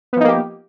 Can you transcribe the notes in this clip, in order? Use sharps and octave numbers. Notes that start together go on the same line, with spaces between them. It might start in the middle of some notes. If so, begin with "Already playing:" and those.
F3 A#3 B3 D#4 G4